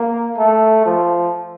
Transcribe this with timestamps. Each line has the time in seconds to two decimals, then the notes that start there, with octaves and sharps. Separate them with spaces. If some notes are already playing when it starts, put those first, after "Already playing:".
Already playing: A#3
0.38 A3
0.86 F3